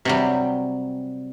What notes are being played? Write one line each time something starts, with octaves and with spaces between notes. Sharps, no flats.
C3 F#3 G3